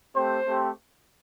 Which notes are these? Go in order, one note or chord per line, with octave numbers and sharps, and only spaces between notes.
A3 C4 G4 C5
A3 C4 G4